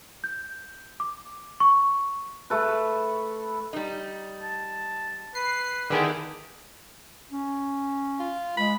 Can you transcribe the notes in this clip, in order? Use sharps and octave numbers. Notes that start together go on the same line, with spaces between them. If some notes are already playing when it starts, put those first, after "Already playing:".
G6
D6
C#6
A3 A4 B4
G3 D#4
A5
B4 C7
D3 D#3 B3 E4 G4 G#4
C#4
F4
G#3 B5